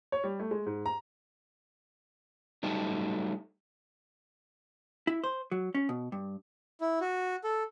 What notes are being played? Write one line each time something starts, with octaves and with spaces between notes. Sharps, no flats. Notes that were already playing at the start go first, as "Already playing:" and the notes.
C#5
G3
A3
G#3
G#2
A#5
F#3 G3 A3 D#4 G4 A5
E4
C5
F#3
C#4
B2
G2
E4
F#4
A4